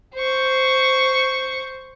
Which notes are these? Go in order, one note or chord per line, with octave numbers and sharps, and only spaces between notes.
C5 C#6